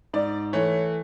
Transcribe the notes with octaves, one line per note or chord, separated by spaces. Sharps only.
G#2 D5
E3 A3 C#5